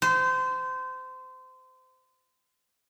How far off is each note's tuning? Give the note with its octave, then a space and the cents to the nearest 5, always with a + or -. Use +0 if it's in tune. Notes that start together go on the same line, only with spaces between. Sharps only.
C5 -25